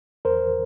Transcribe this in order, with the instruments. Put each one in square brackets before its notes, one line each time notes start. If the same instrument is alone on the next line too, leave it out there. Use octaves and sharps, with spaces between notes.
[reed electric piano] E2 A#4 C5